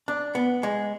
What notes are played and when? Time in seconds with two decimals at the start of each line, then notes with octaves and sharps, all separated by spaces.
0.08 D4
0.35 B3
0.63 G#3